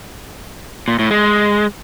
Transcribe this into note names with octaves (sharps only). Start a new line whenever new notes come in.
A#2
A2
G#3